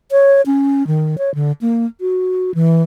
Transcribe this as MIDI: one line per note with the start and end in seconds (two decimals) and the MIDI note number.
0.11 0.41 73
0.46 0.86 61
0.87 1.16 51
1.18 1.33 73
1.35 1.52 50
1.61 1.86 58
2.00 2.54 66
2.55 2.83 52